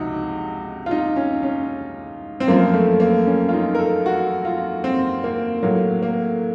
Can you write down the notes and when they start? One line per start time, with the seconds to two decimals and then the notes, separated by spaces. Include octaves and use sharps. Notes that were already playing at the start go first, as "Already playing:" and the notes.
Already playing: C#2 C3 F3 D#4 F#4
0.86 F4
0.91 D#4
1.16 C#4
1.43 C#4
2.40 C4
2.48 F#2 F3 A#3
2.74 A3
3.00 A#3
3.27 C#4
3.49 F4
3.53 D#4
3.75 A#4
3.79 A4
4.06 F#4
4.45 F4
4.84 C4
5.24 A#3
5.63 A2 F#3 A#3
6.03 A#3